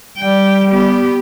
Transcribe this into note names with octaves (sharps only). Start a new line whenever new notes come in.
G3 G5
B3 G4